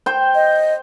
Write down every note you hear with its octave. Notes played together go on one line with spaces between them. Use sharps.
C5 G5
D#5